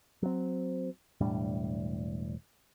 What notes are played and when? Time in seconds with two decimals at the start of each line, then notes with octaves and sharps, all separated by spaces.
0.22 F#3 C4
1.21 E1 A2 G3 D4